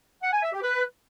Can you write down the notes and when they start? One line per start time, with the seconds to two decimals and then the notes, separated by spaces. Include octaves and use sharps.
0.23 F#5
0.33 G#5
0.43 E5
0.53 G4
0.63 B4